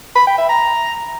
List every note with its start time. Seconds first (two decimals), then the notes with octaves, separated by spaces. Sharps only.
0.16 B5
0.27 G5
0.38 E5
0.49 A#5